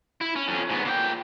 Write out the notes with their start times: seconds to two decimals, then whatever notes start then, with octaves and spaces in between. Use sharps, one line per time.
0.21 E4
0.36 C#4
0.48 F2 C#4
0.70 G#2 B3
0.85 A#2 G5